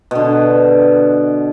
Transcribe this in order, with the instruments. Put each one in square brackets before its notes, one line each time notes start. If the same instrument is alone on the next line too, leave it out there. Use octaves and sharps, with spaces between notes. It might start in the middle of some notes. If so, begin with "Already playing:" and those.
[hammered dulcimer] B2 D3